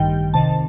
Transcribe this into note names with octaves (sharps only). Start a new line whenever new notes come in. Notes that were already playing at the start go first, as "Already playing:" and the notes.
Already playing: A1 G2 D#3 G5
C2 C3 D#3 A5